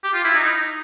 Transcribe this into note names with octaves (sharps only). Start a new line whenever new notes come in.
G4
F4
E4
D#4